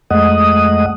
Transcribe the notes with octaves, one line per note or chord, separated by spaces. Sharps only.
F2 G#3 A3 D#5 F#5 D#6